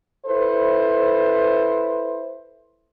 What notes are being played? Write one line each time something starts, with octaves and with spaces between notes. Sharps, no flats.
E4 A4 B4 C5